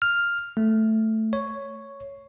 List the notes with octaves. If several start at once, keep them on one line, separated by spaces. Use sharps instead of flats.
F6
A3
C#5